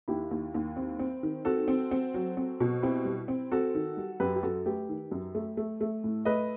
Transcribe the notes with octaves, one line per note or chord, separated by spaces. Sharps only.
D#2 E4 G4
D#2
D#2
C4
C4
D#3
C4 F#4 A4
C4
C4
F#3
C4
B2
C4 E4 G4
G3
C4
C4 F#4 A4
D#3
G3
F#2 G4 B4
G4
F#2 F#4 A4
A3 G4 B4
D#3
F#2
A3
A3
A3
A2
A3 B4 D#5